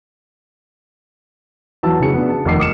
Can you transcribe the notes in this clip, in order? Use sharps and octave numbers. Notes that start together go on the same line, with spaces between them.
E2 F#3 E4 A5 E6
F1 C#3 F#4 G#4 C#7
B3 D4
A5
F1 D#2 D6 C7
D6 D#6 F6 C#7 E7